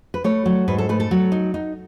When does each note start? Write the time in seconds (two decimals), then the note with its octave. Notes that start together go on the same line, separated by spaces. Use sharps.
0.14 B4
0.24 A3 C#5
0.46 F#3
0.68 G#2 B4
0.78 A4
0.89 A3 B4
1.00 A4
1.11 F#3
1.32 D#4
1.54 D#4